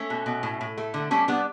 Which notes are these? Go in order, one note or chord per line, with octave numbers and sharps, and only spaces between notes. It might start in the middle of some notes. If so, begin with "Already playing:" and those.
Already playing: A3 C#4
B2
B2
A2
A2
A3
D3
G3 A3 C#4
G3 B3 D4